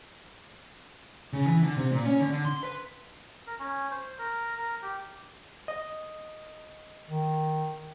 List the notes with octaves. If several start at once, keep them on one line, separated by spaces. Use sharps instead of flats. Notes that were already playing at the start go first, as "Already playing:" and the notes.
C#3
E3
D3
C3
A#2
C#4
D3
D3
C6
B4
A#4
C#4
C5
A#4
A#4
G4
D#5
D#3